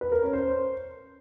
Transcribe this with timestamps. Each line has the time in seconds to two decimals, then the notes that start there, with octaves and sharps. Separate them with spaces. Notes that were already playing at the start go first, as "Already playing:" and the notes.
0.01 B4
0.12 A#4
0.23 C#4
0.33 C5